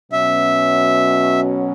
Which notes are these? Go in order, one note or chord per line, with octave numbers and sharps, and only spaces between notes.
B2 F#3 C#4 E5